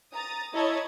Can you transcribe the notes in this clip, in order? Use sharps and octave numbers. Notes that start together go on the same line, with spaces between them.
A#5 D#6 A6
E4 C#5 D#5 A5 B5 G#6